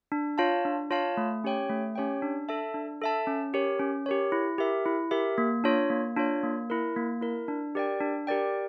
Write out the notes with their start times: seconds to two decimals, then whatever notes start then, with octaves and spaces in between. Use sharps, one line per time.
0.12 D4
0.38 F4 C#5 F5 A5
0.65 D4
0.91 F4 C#5 F5 A5
1.17 A3
1.44 C#4 G4 C#5 G5
1.70 A3
1.95 C#4 G4 C#5 G5
2.22 D4
2.49 A4 E5 A5
2.74 D4
3.02 A4 E5 A5
3.27 C#4
3.54 G4 A#4 C#5
3.79 C#4
4.06 G4 A#4 C#5
4.32 E4
4.58 G4 A#4 E5
4.86 E4
5.11 G4 A#4 E5
5.38 A#3
5.64 D4 F4 C#5
5.90 A#3
6.17 D4 F4 C#5
6.43 A#3
6.70 E4 A#4
6.96 A#3
7.21 E4 A#4
7.48 D4
7.75 G4 A#4 D5 G5
8.01 D4
8.27 G4 A#4 D5 G5